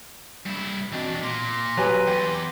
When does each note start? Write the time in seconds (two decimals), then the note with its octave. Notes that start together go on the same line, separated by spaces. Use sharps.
0.46 G2 E4
0.93 E2 C4 D4 F#4 D#5
1.23 A#2 C6 D6 A#6
1.77 F#3 G4 B4 G#5
2.07 E2 G5